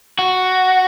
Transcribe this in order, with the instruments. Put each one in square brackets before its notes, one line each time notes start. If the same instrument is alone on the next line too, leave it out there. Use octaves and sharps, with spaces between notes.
[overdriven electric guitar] F#4